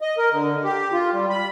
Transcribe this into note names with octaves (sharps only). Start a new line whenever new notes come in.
D#5
A#4
D3
G4
F4
G3
B5